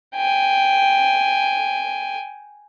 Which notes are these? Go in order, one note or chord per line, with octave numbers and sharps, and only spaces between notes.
G5 G#5